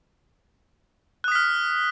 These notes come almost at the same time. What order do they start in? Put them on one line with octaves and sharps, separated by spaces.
F#6 D#6 B6 F6